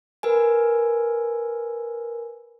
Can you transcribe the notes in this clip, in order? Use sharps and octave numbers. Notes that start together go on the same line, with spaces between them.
A#4 B4 G#5